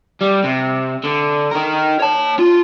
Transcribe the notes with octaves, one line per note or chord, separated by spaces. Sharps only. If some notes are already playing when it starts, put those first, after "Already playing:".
G3
C3
D3
D#4 A#4
C#5 A5
F4